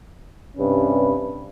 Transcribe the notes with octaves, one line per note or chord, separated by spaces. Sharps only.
G2 C3 C#4 B4